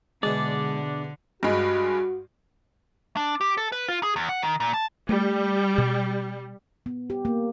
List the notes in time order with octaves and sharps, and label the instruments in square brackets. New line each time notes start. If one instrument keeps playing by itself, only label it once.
[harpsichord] E2 B2 [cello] D3 [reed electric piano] G#3 [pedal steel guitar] D4 D5
[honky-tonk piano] G2 G#3 [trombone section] F#4
[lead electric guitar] D4
G4
A4
B4
F4
G#4
E2
F#5
D#3
A#2
A5
[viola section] G3 [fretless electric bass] A3
[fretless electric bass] B2
[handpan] B3
G4
A#3